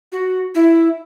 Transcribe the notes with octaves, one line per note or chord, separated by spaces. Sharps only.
F#4
E4